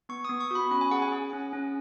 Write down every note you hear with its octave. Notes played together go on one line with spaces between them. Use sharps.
B3 C#6
B3 D#6
C#6
F#4 B5
C#4 B5
G#5
G#4 F#5
G#5
G#4
C#4
C#4